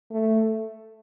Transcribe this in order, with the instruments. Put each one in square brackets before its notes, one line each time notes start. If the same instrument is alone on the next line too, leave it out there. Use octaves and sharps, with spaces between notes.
[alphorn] A3